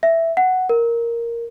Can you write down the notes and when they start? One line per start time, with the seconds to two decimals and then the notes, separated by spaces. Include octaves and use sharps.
0.03 E5
0.37 F#5
0.69 A#4